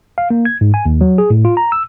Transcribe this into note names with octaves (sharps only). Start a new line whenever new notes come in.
F5
A#3
G#6
G#2
G#5
D#2
F#3
G#4
A2
F4
A#5
E6